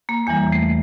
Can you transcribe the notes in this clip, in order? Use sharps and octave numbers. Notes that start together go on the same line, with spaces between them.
A#3
E2 E3 G3 A#3
A3